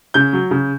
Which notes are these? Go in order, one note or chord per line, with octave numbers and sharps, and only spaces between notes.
C#3 G6
F#3
C#3